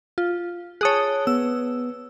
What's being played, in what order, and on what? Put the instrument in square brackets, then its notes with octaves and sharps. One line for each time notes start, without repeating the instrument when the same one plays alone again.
[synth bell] F4
[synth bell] G#4 C#5 [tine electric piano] A5 D#6 F#6
[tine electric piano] B3 [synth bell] E6